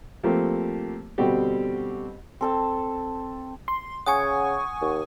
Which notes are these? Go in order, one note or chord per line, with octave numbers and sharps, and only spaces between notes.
F3 A3 A#3 C4 G4
B2 D3 G3 C4 F#4 G4
C4 A4 A5
C6
C#3 F#5 G#5 C#6 D#6 G#6
D#2